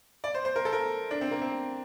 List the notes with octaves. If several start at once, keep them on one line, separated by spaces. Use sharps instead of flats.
D5
C5
C5
A#4
A4
A#4
D4
C4
A#3
C4